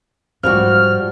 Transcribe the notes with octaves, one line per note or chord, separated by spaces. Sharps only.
G#2 F3 G3 F#4 F6